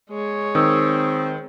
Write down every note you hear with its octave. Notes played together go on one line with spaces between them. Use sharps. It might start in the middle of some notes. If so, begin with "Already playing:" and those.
G#3 C#5
D#3 C4 D#6 E6